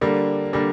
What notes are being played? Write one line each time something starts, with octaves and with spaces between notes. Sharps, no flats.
D3 G3 A#3 D4
D3 G3 A#3 D4